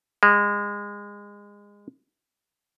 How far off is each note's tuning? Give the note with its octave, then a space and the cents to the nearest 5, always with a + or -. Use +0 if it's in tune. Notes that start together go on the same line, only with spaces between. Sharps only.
G#3 -25